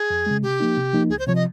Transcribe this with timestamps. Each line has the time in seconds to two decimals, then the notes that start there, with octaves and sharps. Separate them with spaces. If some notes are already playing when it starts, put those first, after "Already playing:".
Already playing: G#4
0.10 F2
0.26 C#3 G#3
0.43 C3 G4
0.60 F3 A#3 D#4
0.77 C3
0.93 F3 A#3 D#4
1.10 C#2 G#4
1.19 C5
1.27 C3 F3 C#5
1.35 D#5